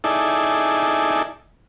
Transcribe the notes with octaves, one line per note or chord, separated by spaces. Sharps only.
D#4 E4 G#4 A4 D5